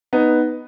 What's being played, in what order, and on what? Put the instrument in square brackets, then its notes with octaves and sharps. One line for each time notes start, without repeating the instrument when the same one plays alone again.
[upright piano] B3 D#4